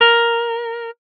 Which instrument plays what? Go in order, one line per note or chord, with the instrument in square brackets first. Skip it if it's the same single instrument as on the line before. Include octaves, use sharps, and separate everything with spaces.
[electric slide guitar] A#4